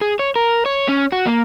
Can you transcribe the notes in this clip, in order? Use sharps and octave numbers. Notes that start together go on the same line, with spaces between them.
G#4
C#5
A#4
C#5
C#4
F#4
A#3